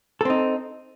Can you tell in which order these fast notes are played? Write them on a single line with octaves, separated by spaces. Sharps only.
A4 C4 D#4